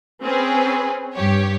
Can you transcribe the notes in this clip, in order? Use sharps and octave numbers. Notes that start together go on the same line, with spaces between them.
C4 C#4 G#4 B4
G2 G4 C#5